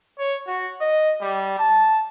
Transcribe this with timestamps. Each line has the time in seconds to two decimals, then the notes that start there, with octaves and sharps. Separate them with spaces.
0.19 C#5
0.47 F#4
0.81 D#5
1.21 G3
1.59 A5